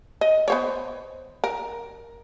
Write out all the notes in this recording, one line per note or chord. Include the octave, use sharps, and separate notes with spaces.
D#5
B3 C5 C#5
A#4